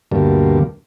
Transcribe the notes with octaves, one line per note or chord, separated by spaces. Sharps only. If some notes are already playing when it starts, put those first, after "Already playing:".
D2 G2 B2 D3 G3 A#3